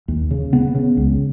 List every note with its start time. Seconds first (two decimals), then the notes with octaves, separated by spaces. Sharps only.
0.08 D#2
0.31 C#3
0.53 C#3 B3
0.75 C#3
0.97 C#2